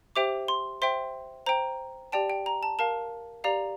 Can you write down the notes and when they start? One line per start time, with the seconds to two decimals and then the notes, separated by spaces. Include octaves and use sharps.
0.16 G4 C5 E5 G5 D6
0.48 C6
0.82 C5 E5 G5 C6
1.46 C5 G5 A#5
2.12 G4 D5 G5 A5
2.30 G5
2.46 A#5
2.63 A5
2.79 A#4 F5 A5
3.44 G4 D5 F5 A#5